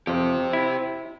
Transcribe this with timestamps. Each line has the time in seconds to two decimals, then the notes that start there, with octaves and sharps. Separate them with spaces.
0.07 F2 G4 C5
0.53 E4